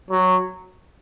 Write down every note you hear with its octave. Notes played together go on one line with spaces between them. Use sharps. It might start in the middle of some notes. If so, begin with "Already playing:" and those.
F#3